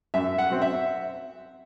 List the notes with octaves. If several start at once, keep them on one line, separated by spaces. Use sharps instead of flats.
F#2 E5
F#5
F#3 C4
E5